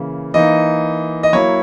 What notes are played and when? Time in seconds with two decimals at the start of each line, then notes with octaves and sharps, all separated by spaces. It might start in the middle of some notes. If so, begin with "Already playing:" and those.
Already playing: C#3 E3 A#3
0.34 E3 A#3 D#4 D#5
1.23 D#5
1.33 F#3 A#3 E4 C#5